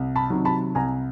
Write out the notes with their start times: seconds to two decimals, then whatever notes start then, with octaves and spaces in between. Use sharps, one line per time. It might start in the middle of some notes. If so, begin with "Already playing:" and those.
Already playing: C2
0.16 A5 B5
0.30 C3 D#3 F#3
0.45 A5 B5
0.75 C2 G#5 A#5